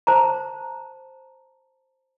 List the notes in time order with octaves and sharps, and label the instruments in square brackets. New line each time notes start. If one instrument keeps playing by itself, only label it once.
[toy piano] C5 A5 A#5